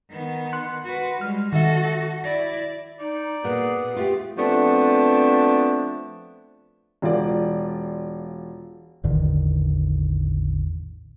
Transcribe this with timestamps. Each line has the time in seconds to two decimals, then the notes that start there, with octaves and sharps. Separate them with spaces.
0.10 D#3 B3
0.53 C6 F#6 C#7
0.85 F#4 B4
1.21 G3 G#3 F6
1.53 D#3 F#4 A4 E5
2.24 E4 D5 A#6
3.00 D#4 D5
3.44 A#2 B3 F#4 G#4 A#4
3.96 A3 F4 G4
4.38 F3 A3 B3 C4 D4
7.02 E1 F4 D5
9.04 A1 E2 D3 D#3